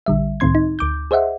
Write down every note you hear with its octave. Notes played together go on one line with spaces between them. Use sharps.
A#1 D3 G3 E5
C#2 A2 D#3 C4 C6 G#6
D#4
D2 D6 G6
G#4 C5 D#5 E5 F#5